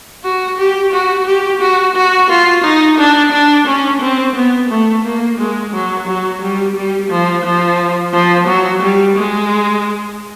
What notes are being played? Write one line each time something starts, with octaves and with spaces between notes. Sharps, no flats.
F#4
G4
F#4
G4
F#4
F#4
F4
D#4
D4
D4
C#4
C4
B3
A3
A#3
G#3
F#3
F#3
G3
G3
F3
F3
F3
F#3
G3
G#3